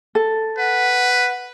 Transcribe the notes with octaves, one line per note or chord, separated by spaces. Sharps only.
A4
B4 F#5